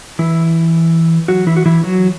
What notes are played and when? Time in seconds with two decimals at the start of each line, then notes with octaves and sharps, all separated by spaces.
0.19 E3 E4
1.28 F#3 F#4
1.46 E3 E4
1.57 F#4
1.66 E3 E4
1.83 F#3 F#4